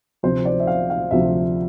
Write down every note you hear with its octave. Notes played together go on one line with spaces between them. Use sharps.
D2 C3 F3 C5
D5
E5
F5
F5
D2 C3 F3 E5